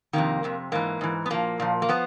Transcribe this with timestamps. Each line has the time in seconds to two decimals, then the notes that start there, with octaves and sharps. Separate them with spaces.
0.13 F2 C3 D#3 A#3
0.44 F2 C3
0.72 G#2 E3 A#3
1.01 G#2 E3
1.26 B3
1.30 A#2 F3 A#3
1.60 A#2 F3
1.82 A#3
1.89 F3 B3